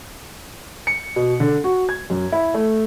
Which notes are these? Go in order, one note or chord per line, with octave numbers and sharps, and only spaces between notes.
C#7
B2
D3
F#4
G#6
F#2
E4
A3